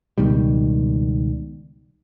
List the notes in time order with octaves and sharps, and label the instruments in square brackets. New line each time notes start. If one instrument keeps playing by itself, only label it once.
[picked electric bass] C#2 B2 D#3 G3